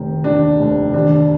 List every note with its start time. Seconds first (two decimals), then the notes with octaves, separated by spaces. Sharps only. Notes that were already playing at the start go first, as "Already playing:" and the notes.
Already playing: F1 D#3
0.24 D#2 D4
0.59 F1
0.94 D#2 D4